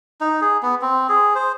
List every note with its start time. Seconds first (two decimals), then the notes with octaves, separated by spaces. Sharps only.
0.21 D#4
0.41 G#4
0.63 B3
0.82 C4
1.09 G#4
1.35 C5